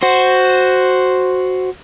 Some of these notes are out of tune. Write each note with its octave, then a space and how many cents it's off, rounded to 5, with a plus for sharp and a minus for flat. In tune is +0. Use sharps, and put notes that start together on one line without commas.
F#4 +0 C5 +0